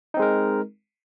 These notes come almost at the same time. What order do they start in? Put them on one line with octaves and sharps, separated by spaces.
D#4 C4 G#3 A#4